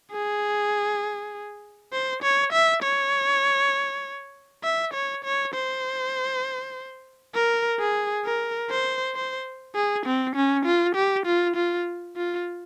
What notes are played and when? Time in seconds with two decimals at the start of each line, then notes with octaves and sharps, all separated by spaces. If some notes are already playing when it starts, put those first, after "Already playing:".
0.12 G#4
1.92 C5
2.23 C#5
2.53 E5
2.83 C#5
4.64 E5
4.94 C#5
5.24 C#5
5.54 C5
7.35 A#4
7.80 G#4
8.25 A#4
8.70 C5
9.15 C5
9.75 G#4
10.06 C4
10.36 C#4
10.66 F4
10.96 G4
11.26 F4
11.56 F4
12.16 F4